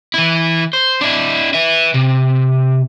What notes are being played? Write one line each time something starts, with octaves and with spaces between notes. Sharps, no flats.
E3 E4
C5
D4 E4
B4 E5
C3